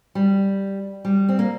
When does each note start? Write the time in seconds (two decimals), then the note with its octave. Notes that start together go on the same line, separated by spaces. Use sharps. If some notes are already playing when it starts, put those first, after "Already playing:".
0.15 G3
1.05 G3
1.29 C4
1.39 A#3